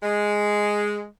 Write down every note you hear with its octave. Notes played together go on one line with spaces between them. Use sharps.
G#3